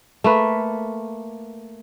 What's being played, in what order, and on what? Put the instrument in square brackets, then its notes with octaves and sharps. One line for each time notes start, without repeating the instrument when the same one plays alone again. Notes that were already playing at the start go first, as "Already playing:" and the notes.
[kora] A3 A#3 B4